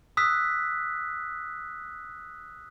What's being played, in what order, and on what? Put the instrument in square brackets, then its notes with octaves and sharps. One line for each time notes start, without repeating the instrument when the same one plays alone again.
[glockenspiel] D#6 E6 F#6 B6